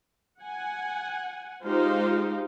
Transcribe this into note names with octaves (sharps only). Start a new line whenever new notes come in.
F#5 G#5
G#3 D#4 F4 G4 C5 F5